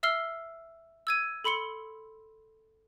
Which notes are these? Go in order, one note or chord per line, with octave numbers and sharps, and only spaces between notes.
E5 E6 F6 C7 G7
E6 G#6 D#7
A4 B5 C6 C#7 G7